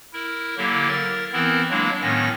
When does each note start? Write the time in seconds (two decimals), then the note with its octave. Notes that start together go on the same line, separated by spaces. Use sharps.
0.13 E4 A#4
0.57 D3 F#3 A#3 E4 G4
0.88 A#4 A6
1.33 E3 B3 C4 E4 A#4
1.70 F#3 G#3 A#3 D4 E4
2.02 A2 D#3 B3 C#4 A#6